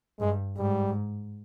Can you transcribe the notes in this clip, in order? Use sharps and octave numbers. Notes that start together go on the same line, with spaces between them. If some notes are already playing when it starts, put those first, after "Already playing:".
G2 G#3
G#2 G3